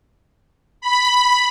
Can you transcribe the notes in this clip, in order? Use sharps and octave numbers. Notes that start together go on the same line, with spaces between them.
B5